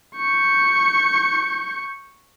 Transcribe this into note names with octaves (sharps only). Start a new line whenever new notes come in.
C#6 G6